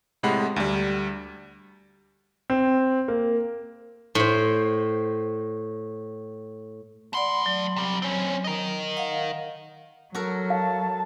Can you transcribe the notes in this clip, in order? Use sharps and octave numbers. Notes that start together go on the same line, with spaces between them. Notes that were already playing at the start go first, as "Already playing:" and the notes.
A2 C3 G#3 F#5 B5
D2 G3
C4
A#3
A2 C5
A3 D5 F#5 B5 C6
F#3
C3 G3
C4 C#4
A#4 D#5
F5 F#5
F#3 F#4 A4 A#4
F5 A5